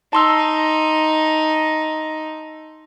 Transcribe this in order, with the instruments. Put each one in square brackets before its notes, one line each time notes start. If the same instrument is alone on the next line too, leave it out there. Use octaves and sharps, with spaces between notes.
[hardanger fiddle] D#4 [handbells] A5 C6 E6